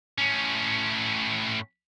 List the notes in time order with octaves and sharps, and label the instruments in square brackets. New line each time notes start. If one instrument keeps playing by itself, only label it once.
[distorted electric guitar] A2 C#4